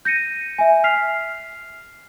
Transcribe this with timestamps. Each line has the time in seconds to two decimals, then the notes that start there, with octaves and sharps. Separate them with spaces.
0.05 G6 A#6 C#7 D#7
0.58 E5 G#5
0.84 F6 B6 C7 F7